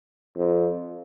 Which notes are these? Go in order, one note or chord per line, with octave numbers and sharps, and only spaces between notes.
F2